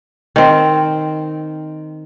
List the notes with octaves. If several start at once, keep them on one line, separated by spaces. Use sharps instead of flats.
D#3 C4